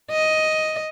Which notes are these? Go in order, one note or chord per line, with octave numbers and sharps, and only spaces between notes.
D#5